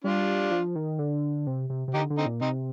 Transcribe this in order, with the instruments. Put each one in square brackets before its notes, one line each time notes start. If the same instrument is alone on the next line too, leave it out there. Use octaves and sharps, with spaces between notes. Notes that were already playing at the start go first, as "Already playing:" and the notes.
[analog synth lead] G3 [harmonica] D4 F4
[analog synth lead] F3
D#3
D3
C3
C3
C3
[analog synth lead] D3 [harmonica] D#4 G4
[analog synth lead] D3
[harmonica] C4 D#4
[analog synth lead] A#2
[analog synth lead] C3 [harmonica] C4 D#4